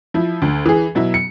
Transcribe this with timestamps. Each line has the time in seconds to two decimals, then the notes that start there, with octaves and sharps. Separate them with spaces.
0.14 F3 E4
0.42 D2
0.66 E3 G#4
0.95 B2 F#3 E4
1.14 C#7